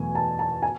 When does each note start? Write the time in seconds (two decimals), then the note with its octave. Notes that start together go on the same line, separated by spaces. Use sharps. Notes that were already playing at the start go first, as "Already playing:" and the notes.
Already playing: E2 B2 F#3 A3 G#5
0.15 A5
0.39 A5
0.63 G#5